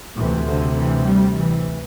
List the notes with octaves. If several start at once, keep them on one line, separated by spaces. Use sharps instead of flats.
D2 C3 E3
D3
E3
G3
E3